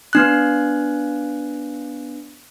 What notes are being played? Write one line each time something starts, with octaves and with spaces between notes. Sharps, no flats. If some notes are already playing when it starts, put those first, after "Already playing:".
B3 D4 F#6